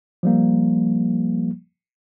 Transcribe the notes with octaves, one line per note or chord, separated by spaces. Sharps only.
F3 G3 A#3